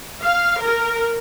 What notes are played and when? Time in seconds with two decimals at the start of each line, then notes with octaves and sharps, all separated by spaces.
0.22 F5
0.61 A#4